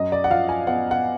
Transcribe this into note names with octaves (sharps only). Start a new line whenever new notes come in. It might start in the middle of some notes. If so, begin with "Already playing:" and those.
Already playing: F#2 D#5
D5
F#5
F3 F5
G#5
B3 F#5
F#5